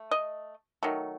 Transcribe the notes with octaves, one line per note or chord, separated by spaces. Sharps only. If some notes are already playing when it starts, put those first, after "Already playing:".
Already playing: A3
D#5
D#3 F#3 A3